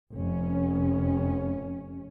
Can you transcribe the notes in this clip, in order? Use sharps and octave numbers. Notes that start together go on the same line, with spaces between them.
F1 C#4